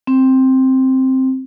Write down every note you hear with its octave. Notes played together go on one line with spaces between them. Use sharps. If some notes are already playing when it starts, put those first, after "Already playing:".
C4